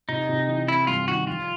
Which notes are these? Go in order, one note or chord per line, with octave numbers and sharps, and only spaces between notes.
C3 D#4
C3
E3
C4 E4
G2 F4
D#3 F#4
F3 F4